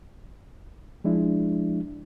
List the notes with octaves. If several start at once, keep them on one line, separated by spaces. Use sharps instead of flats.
F3 G#3 D4 E4